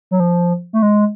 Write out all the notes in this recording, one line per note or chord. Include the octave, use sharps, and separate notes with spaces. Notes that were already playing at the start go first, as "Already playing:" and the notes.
F#3
F3
A3
G#3